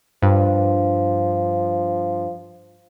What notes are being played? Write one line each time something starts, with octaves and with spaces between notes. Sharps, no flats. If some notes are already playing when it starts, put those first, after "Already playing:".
G2 F3